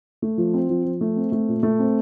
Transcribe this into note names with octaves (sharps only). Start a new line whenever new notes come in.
A3
F3
C4
F3
F3
A3
C4
A3
A#2
A3
C4